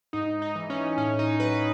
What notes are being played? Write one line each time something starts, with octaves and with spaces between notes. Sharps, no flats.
G#2 D#4
D#4
E3
C#4
A2 C#4
D#4
F#3 B4